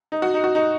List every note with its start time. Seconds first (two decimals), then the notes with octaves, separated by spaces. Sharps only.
0.12 D#4
0.22 F#4
0.34 D#4
0.44 F#4
0.55 D#4